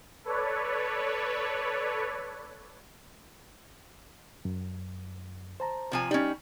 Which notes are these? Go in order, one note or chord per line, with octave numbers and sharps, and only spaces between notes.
A4 B4 C#5 D5
F#2
C5 A5 A#5
C3 F3 G#5
G3 C#4 D#4